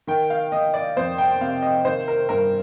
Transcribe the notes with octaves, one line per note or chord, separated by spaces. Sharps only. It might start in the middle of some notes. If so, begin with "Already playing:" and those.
D#3 G5
F5
D#3 D#5
D5
F2 C5
G5
C3 F5
D#5
D#3 C5
A#4
G2 A#4